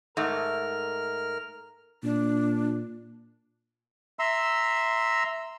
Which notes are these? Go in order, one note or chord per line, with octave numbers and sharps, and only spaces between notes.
G#2 A3 A#4 F6
A#2 D4
E5 A#5 C6 E6